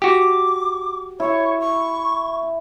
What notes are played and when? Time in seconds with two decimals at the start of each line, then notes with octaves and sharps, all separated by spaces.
0.02 F#4 G4 D6
1.20 E4 C#5
1.60 C#6